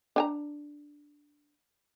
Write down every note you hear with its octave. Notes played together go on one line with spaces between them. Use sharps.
D4 G#5 A#5